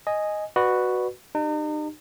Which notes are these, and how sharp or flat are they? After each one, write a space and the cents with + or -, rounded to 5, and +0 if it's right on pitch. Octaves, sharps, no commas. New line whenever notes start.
D#5 +0 G#5 +0
F#4 +0 B4 +0 D5 +30
D#4 -40 G4 +0